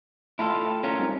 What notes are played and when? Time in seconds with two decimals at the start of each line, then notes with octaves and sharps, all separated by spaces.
0.39 A3 E4 F4 A4 G5 A5
0.84 C#4 F4 A#4
0.99 G3 C4 D#4